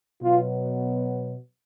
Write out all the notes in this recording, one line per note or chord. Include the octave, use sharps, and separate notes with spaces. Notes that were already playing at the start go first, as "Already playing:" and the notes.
B2 F#3 B3 F4